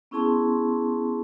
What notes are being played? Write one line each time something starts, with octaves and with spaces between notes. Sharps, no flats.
B3 C#4 E4 G#4 A5 C6